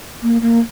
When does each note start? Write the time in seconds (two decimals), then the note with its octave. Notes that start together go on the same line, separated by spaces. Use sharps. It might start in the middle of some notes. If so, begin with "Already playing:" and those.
0.23 A#3
0.42 A#3